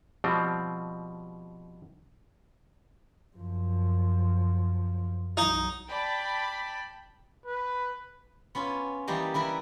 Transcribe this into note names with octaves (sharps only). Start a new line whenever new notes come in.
B2 F3 G3 C4
F#2 F3
B1 F#3 D#4
D5 G5 A5 B5
B4
B3 C#4 F4 G#5
E3 G3 A#3 G4 D#5
E3 E4 A#4 B4